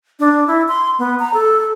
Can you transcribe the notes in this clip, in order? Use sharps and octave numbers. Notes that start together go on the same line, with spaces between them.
D4
E4
C6
B3
A#5
A4